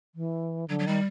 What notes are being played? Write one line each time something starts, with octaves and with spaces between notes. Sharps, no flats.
E3
D3 F#3
F#3
D#3 G3